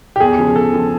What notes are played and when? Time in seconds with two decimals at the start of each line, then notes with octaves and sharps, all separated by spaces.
0.16 G4
0.20 E2 G#4
0.38 C#3 F3
0.56 E2 A4
0.73 C#3 F3